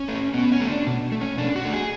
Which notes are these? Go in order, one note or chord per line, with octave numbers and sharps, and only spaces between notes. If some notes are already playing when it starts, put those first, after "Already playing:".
Already playing: C#4
A3
B2 B3
C#4
A3
D4
B2
A3
C#4
B2 D4
F#4
A3
G#4